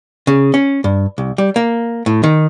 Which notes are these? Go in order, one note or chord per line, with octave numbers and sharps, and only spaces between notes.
C#3
C#4
G2
C2
G3
A#3
A2
D#3